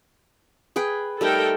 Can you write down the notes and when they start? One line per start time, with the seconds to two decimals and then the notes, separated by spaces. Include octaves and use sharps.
0.76 G#4 B4 G5
1.21 G3 A3 D#4 A4 A#4 G5